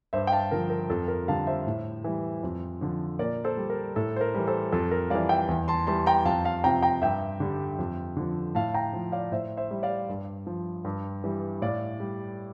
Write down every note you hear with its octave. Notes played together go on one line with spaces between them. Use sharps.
G2 C5 E5
G5
F5 A5
D3 F3 A#4
A#4
F2 A4
A#4
D3 G3 F5 A5
C5 E5
A2
E3 G3
F2
D3 F3
A#2 A#4 D5
A4 C5
G3
A#4
A2 A4
C5
A#4
E3 G3
A4 C5
F2 A4
A#4
E3 G3 D5 F5
E5 G5
E2
A5 C6
E3 G3 A5 C6
G5 A#5
F2 F5 A5
F5 A5
C3 F3 G5 A#5
G5 A#5
G2 E5 G5
D3 G3
F2
D3 F3
A2 F5 A5
G5 A#5
F3
D5 F5
A2 C5 E5
C5 E5
G3
D5 F5
G2
F3
G2
E3 G3
A2 D5 F5
G3